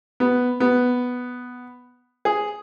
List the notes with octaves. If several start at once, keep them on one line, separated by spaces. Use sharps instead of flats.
B3
B3
G#4